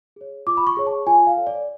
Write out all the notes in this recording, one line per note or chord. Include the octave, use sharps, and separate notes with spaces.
G#4 C#5
F4 D6
B5
C#6
G#4 C#5
A5
F4 G#5
F5
A4 C#5
D5